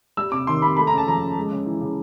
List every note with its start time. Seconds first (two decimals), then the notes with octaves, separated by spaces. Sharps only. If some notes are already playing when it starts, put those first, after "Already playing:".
0.17 G3 E6
0.32 C3 D6
0.47 D#3 C6
0.62 C3 B5
0.77 A3 B5
0.87 C#3 A#5
0.98 A5
1.07 F3 A#5
1.22 C#3
1.37 G#3
1.51 C#3
1.66 E3
1.81 C#3